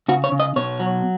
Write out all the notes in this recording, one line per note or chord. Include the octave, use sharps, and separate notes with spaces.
C#3 F#4
C#5
C#3
D#5
B2 C#5
F#3